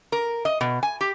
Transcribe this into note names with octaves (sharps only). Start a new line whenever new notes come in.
A#4
D#5
B2
G#5
G4